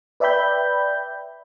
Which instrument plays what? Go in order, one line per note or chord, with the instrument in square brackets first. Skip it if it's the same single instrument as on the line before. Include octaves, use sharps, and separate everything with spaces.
[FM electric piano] B4 D5 E5 G5 B5 G6